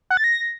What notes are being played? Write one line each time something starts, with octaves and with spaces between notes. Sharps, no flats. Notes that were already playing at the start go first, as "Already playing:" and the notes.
F#5
A6
A#6